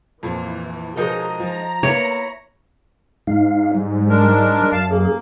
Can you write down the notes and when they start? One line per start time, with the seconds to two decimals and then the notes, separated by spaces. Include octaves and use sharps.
0.23 F2 A#2 E3
0.96 B2 F3 G#3 D#4 G#4 A#4 D#5 A#5
1.40 F3 A#5
1.83 A#3 B3 E4 C#5
3.27 G#2 D#4 F5
3.75 G3
4.10 G#3 D4 A#4
4.72 F#2 F5 A5
4.90 A#3 G#4